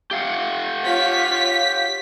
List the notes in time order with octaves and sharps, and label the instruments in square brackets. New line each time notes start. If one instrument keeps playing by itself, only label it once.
[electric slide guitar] G4 F5 F#5
[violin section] F4 C#5 [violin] B6